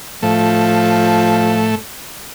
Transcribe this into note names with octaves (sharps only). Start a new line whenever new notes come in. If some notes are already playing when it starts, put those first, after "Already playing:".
A2 F3 A3